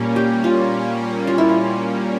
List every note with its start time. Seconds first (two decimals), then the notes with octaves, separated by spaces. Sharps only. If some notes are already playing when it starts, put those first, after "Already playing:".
Already playing: A#2 G3 A#3 C#4
0.16 G4
0.44 F4
1.27 F4
1.38 E4
1.49 F4